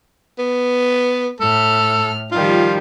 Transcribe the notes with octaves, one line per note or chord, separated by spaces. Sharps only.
B3
A2 A4 F6
D#3 F3 G3 F4